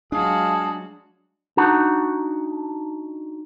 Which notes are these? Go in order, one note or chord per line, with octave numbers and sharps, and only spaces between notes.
F#3 G#3 D4 F4 F#4 G#4 F5 A5
D4 D#4 F#4 F#5